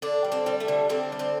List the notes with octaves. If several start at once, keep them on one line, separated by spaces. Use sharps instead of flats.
D3 D4
G3
C4
G3
A3
D3
D3 C4
G3
C4